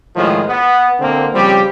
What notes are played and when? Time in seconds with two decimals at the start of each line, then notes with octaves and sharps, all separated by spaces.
0.16 E2 A2 D#3 F3 G#3
0.48 B3
1.00 B2 D3 A#3 C4
1.34 C#3 F3 G3 C4 G4